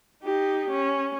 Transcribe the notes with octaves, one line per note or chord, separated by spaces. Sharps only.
D#4 G4
C#4